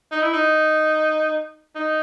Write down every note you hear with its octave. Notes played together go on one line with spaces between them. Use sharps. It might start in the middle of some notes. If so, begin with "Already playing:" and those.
D#4
E4
D#4
D#4